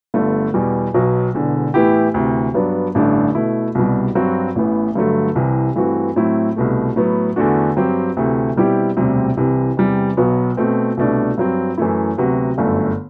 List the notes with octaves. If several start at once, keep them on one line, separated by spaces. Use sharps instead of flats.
G1 G2 D3 A3
E2 B2 G3
B1 B2 F#3
E1 E2 D3
A2 E3 B3 E4 G4
D2 C3 E3
G2 F#3 B3 D4
A1 G2 D3 A3 D4
B2 A3 E4
C2 B2 G3
G2 F#3 C4 F#4
A1 A2 E3 B3
G2 D3 F#3 A3
C2 C3 E3
G2 E3 A3 C4 F#4
A2 F#3 C4 E4
C2 B2 A3
A2 F#3 B3
E2 D3 A3 D4 F#4
G2 F#3 C4 G4
D2 C3 E3 A3
B2 G3 C4 E4 G4
E1 D2 C3 G3 C4
C2 C3 E3
E2 C3 G3
B1 B2 F#3 B3
B2 A3 C4
C2 B2 A3 D4
G2 F#3 C4
F#2 E3 A3 E4
D2 C3 F#3 B3 F#4
G1 F#2 D3 A3